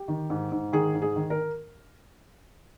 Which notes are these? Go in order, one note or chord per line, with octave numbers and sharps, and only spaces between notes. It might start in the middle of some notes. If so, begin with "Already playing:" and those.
Already playing: G4
D#3
G#2
G#2
D#3 G#4
G#2
G#4
D#3
A#4